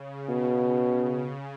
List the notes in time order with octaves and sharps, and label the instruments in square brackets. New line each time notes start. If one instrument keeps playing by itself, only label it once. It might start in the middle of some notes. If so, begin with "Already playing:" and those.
Already playing: [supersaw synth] C#3
[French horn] B2
[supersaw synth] C#3